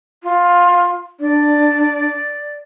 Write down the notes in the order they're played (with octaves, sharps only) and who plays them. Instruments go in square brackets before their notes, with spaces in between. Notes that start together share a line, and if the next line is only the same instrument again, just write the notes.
[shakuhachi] F4
[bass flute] D4 [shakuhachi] D5